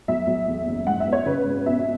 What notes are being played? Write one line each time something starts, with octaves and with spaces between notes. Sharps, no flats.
B1 E5
B1
E2
F#1
G#2 F#5
E5
B3
C#5
C#3 B4
G#1
B2 E5